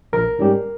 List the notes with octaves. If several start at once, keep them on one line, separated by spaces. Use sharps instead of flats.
A#1 A#4
G#2 G3 C#4 G4